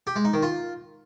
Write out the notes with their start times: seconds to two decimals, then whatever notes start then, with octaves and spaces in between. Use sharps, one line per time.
0.07 G4
0.16 G#3
0.25 D#4
0.34 D#3
0.42 F4